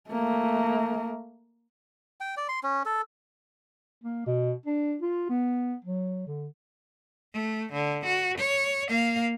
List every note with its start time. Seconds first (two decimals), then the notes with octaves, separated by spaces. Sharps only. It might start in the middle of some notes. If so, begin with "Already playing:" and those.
0.10 A3 A#3
2.20 G5
2.37 D5
2.49 C6
2.63 C#4
2.85 A4
4.03 A#3
4.27 B2
4.66 D4
5.02 F4
5.30 B3
5.85 F#3
6.27 D3
7.34 A3
7.73 D3
8.06 F#4
8.38 C#5
8.88 A#3 F5